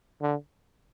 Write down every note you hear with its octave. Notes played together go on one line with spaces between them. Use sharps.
D3